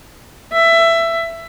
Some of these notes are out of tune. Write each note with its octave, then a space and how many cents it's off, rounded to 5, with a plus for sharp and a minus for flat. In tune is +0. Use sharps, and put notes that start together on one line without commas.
E5 +15